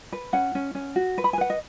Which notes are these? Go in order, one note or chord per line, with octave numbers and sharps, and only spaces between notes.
B4
C#4 F#5
C#4
C#4
F#4
B4
B5
G#5
B4 F#5
D#5